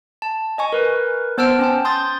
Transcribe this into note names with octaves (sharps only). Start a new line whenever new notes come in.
A5
D#5 G#5 C#6
A#4 B4
B3 C5 A5 E6 F6 D7
C#4 G5 A5
C6 D#6 G6 A6